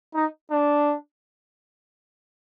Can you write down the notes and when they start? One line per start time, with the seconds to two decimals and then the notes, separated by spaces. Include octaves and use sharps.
0.14 D#4
0.51 D4